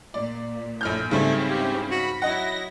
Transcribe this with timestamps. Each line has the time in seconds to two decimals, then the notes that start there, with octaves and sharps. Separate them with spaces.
0.14 A#2 D5
0.81 A#1 A2 F6 G6
1.11 G#2 C#3 G3 A3 C4 C#4 E4
1.49 G4
1.91 F#4 B5
2.22 F#3 E4 D#5 F#5 A#6